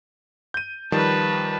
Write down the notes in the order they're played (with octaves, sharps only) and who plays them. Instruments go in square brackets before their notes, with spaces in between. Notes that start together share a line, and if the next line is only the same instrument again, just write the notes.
[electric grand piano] G6 D#7
[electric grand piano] D#3 F3 G3 [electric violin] B4 A5